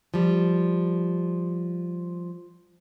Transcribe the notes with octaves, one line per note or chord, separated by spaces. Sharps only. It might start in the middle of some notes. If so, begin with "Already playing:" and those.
F3 G3